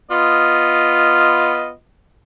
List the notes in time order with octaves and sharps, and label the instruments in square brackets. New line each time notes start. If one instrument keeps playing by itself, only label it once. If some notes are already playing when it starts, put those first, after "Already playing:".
[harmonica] B3 F4 D#5